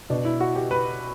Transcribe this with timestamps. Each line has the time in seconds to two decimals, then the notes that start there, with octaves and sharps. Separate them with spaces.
0.10 B2 D4
0.25 E4
0.40 F#4
0.56 G4
0.71 B4